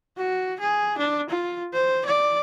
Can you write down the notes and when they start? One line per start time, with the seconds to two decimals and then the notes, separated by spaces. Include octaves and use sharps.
0.17 F#4
0.60 G#4
0.98 D4
1.30 F4
1.73 C5
2.05 D5